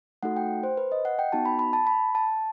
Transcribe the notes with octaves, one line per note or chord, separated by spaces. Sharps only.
A3 D#4 F#4 A4 F#5
G5
C5
B4
D#5
F#5
G5
B3 D#4 F#4 A5
B5
B5
A5
B5
A5